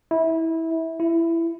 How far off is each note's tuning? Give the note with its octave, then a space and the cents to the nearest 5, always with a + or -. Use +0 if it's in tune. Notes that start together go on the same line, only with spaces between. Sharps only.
E4 -20
E4 +15